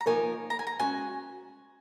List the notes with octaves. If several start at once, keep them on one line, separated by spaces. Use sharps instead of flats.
A#5
F3 A#3 D#4 A#4 C#5 G#5
A#5
G#5
A#5
G#3 C#4 F#4 G#5